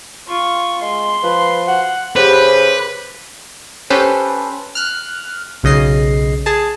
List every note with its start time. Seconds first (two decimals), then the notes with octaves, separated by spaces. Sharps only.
0.28 F4 C#6
0.82 G#3 C6
1.24 F3 B4
1.68 F#5
2.16 C#3 G4 B4 C5
3.90 C#4 G4 A4 B4 C5
4.75 F6 F#6
5.63 B1 C#3 D#5 C7
6.46 G#4 A5